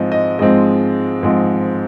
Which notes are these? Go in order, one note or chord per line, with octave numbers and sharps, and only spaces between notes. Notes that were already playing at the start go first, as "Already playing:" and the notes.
Already playing: G#2 F3 G#3 C4 D#5
D#5
G#2 F3 G#3 C4 D#5
G#2 F3 G#3 C4